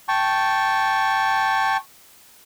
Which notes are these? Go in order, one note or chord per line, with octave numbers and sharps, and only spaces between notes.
G5 A5 C#6